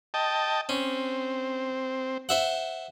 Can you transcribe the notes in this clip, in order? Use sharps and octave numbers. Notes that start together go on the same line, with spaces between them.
D#5 G5 A5
C4 C#4
C5 E5 F#5